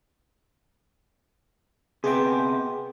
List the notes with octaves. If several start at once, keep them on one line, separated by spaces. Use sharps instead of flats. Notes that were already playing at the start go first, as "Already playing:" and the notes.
C3 B3 G#4 G5